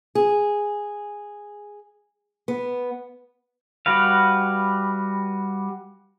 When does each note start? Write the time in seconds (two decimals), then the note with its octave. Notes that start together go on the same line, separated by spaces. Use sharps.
0.15 G#4
2.48 B3
3.86 G3 F#4 B4 F5